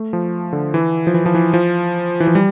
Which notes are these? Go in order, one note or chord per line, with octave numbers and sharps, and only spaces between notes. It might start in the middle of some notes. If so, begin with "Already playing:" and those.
Already playing: A3
F3
D3
E3
F3
E3
F3
E3
F3
E3
F3
G3